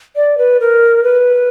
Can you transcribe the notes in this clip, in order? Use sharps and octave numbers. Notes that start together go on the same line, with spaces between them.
D5
B4
A#4
B4